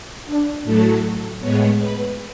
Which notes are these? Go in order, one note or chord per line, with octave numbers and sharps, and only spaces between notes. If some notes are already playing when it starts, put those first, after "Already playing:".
D4
A2 F#3 A3 A4
A2 G#3 B3 C#5
B4